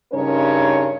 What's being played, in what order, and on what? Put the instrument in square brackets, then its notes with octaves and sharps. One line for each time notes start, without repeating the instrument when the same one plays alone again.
[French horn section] G2 C#3 C#4 D#4 A#4 C#5